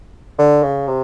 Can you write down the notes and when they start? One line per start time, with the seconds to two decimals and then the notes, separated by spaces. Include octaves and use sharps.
0.39 D3
0.63 C#3
0.88 C3